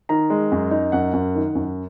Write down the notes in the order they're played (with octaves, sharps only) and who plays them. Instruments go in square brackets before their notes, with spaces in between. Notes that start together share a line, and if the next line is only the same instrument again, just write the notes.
[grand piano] D#3 A#5
G#3
F#2
D#4
F#2 F#5
F#2
D#3
F#2